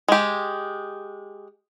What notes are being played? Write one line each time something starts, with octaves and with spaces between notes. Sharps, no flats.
G#3 G4